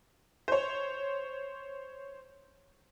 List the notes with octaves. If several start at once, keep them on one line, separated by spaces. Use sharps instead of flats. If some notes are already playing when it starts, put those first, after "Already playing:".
C5 C#5